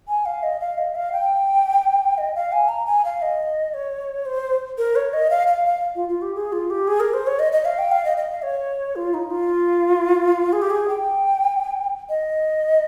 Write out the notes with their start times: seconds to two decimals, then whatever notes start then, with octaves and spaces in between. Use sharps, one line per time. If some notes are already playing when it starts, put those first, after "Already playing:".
0.08 G#5
0.26 F5
0.43 D#5
0.60 F5
0.78 D#5
0.95 F5
1.12 G5
2.18 D#5
2.35 F5
2.52 G#5
2.69 A#5
2.86 G#5
3.05 F5
3.22 D#5
3.74 C#5
4.26 C5
4.78 A#4
4.96 C#5
5.13 D#5
5.30 F5
5.47 F5
5.66 F5
5.96 F4
6.09 F4
6.22 G4
6.35 G#4
6.52 F4
6.70 G4
6.88 G#4
7.00 A#4
7.14 C5
7.27 C#5
7.39 D#5
7.53 D#5
7.65 F5
7.79 G5
7.92 F5
8.05 D#5
8.17 D#5
8.31 F5
8.43 C#5
8.96 F4
9.14 D#4
9.31 F4
10.53 G#4
10.62 G4
10.70 G#4
10.88 G5
12.09 D#5